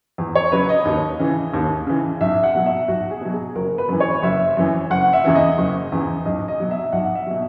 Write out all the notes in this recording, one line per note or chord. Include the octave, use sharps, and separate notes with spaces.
E2
C#5
C#3 F#3 B4
D#5
D#2
C#3 E3
D#2
C#3 E3
B1 E5
F#5
B2 F#3
E5
B1 F#4
G#4
B2 F#3
G#4
F#1 A#4
B4
F#2 E3
C#5
F#1 E5
F#2 E3
F#1 F#5
E5
E2 C#3 E3
D#5
F#1
E2 C#3 E3
B1 D#5
D#5
B2 F#3
E5
B1 F#5
E5
B2 F#3